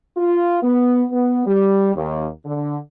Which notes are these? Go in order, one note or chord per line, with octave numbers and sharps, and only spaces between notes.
F4
B3
B3
G3
D#2
D3